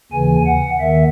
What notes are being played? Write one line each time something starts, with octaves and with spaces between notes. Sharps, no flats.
D#2 C#3 E3 G#5
F#5
D#2 D#3 E5